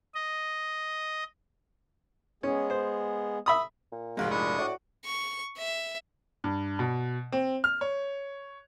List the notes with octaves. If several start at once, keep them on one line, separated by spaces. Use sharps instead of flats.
D#5
G#3 B3 C#4 G#4
C5
E5 B5 D#6
A#2
F1 G#2 G#3 F#4 F5
D4 E4 C#6 D#6
A2 F#4 D5
C#6
E5
G2
B2
C4
F6
C#5